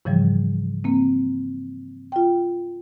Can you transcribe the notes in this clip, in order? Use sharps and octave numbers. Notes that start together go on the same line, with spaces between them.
G#2 C#3 E3 F3 G3
A#3 C4
F4 G5